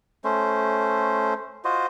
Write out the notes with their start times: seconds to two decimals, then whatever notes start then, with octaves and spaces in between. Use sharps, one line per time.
0.24 A3 C#4 C5
1.65 F4 F#4 C5 D#5